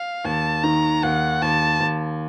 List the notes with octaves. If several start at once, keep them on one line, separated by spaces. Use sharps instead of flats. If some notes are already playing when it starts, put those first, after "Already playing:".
Already playing: F5
D#2 A5
D#3 A#5
D#2 F#5
D#2 A5
D#2